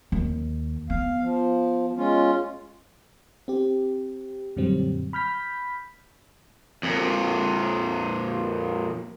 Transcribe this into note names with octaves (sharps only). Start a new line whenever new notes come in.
D#2
B3 F5
F3
G#3 C#4 F4
C4 G4
F#2 A#2 D3 F#3 G3 C4
B5 F6 G6 B6
F2 A#2